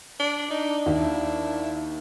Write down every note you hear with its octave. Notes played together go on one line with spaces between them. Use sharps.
D4
D4 D#4
D#2 E4